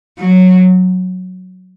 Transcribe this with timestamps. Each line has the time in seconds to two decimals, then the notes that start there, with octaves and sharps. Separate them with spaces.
0.19 F#3